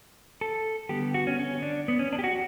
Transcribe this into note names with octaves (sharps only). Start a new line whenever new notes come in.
A4
D3 G3 B3 G4
F#4
C#4
C#4
D4
B3
C#4
D4
G4
F#4